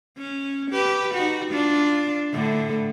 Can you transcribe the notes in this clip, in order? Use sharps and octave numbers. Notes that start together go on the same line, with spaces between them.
C#4
G4 B4
D#4 F#4
D4 F4
A2 D3